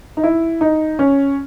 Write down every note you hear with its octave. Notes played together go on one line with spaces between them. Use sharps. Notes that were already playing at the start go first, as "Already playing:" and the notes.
D#4
E4
D#4
C#4